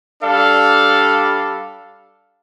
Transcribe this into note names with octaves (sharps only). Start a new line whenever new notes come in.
G3 D4 A4 F5